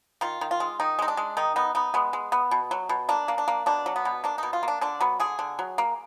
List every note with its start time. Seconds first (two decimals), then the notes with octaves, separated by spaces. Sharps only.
0.21 D#3 F4
0.41 D#3
0.51 F4
0.60 G#3
0.80 D#3 D#4
0.99 G#3 D#4
1.08 D4
1.17 G#3
1.37 D#3 D#4
1.56 B3 D#4
1.75 B3 D#4
1.94 G#3 B3
2.13 G#3
2.32 B3
2.51 B2
2.71 F#3
2.89 B2
3.09 A#3 D4
3.28 A#3
3.38 D4
3.48 A#3
3.66 B2 D4
3.86 F#3
3.96 B3
4.05 B2
4.24 A#3 D4
4.38 B2 D#4
4.53 F4
4.63 A#3
4.68 D4
4.81 D3 D4
5.00 F#3 B3
5.20 D3 G#4
5.39 D3
5.59 F#3
5.78 A#3